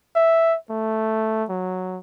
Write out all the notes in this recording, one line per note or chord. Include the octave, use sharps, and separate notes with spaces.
E5
A3
F#3